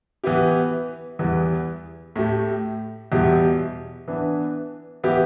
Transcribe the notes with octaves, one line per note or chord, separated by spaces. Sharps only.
E3 B3 E4 G4
E2 E3 G3 B3 E4
A2 A3 G4
E2 B2 G3 E4 G4
E3 B3 D4
E3 B3 E4 G4